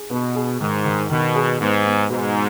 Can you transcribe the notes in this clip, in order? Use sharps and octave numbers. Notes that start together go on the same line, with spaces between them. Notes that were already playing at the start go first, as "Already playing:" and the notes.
Already playing: G#4
B2 B3
G#4
G#2 D#3
D#3
B2 D#3
G#4
G#2 B3
B3
G#2 B2